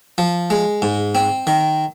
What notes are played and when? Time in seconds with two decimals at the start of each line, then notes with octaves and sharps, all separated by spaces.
0.18 F3
0.50 G#3
0.82 G#2
1.15 C4
1.47 D#3